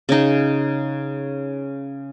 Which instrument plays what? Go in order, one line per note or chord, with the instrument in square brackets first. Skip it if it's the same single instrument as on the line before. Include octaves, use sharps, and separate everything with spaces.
[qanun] C#3 D#4